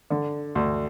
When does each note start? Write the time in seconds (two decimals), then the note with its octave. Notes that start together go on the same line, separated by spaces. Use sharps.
0.10 D3
0.55 D2